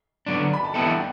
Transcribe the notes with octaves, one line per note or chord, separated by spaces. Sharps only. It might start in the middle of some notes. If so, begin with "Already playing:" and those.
D3 F#3 B3 D4
B5
A5
E3 G3 B3 E4 A4 G5
F#5